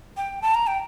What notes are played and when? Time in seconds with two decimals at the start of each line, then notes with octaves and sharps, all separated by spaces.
0.17 G5
0.42 A5
0.55 A#5
0.67 G5